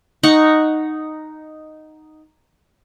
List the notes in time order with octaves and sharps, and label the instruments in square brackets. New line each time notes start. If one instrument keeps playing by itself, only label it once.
[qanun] D#4 F#5 C#6